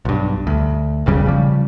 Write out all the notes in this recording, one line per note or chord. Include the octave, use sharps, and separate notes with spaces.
B1 G2
D2
E1 A#1 C#3 G3
C#3 F3 G3